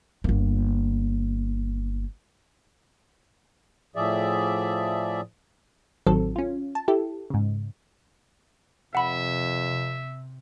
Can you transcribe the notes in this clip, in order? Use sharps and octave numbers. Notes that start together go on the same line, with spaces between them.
G1 A#3
A2 F3 G#4 D5 E5
A1 D#3 F#3 C4 A4
C#4 F4
A5
E4 G4 A4
G#2 C#3
F2 C3 E5 F#5 B5